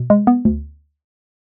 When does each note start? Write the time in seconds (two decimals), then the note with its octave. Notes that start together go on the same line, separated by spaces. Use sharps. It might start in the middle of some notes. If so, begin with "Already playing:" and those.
Already playing: B2
0.10 G#3
0.27 B3
0.45 D2